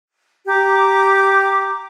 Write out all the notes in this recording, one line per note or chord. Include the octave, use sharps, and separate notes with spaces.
G4 A#5 D6